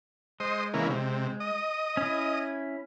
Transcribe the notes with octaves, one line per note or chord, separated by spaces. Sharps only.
G#3 C5 D#5
C#3 E3 A#3
C3
D#5
C#4 E4